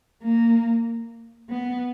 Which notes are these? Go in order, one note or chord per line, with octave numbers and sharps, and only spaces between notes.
A#3
B3